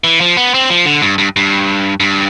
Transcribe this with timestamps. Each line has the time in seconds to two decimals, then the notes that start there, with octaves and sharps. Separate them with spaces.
0.04 E3
0.20 F3
0.37 B3
0.54 C4
0.70 F3
0.86 D3
1.02 G2
1.18 G2
1.36 G2
2.00 G2